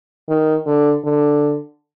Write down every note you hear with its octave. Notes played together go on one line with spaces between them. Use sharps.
D#3
D3
D3